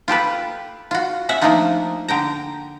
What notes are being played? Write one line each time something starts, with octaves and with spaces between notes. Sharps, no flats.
F4 G4 A4 B4
F4 F#4
C#4 E5 F#5
F3 A3 A#3 D4 D#4 F4
D3 G5 A#5